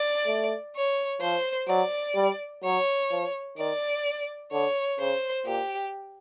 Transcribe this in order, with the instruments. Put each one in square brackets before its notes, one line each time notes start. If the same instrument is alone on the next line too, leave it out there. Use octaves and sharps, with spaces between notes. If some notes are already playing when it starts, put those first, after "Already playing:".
Already playing: [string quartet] D5
[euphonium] A3
[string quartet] C#5
[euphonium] F3 [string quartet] C5
[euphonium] F#3 [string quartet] D5
[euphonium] G3
[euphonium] F#3 [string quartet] C#5
[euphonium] F3
[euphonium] D#3 [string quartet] D5
[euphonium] D3 [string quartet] C#5
[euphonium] C#3 [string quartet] C5
[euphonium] A#2 [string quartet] G4